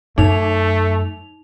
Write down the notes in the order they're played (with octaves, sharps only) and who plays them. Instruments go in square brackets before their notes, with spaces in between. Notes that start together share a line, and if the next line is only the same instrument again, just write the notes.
[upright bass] F#2 [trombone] A3 [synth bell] D#4 F7